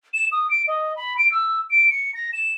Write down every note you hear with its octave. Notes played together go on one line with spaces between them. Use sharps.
E7
D#6
D7
D#5
B5
D7
E6
D7
C#7
A#6
E7